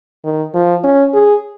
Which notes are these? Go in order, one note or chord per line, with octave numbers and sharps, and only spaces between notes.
D#3
F3
C#4
G#4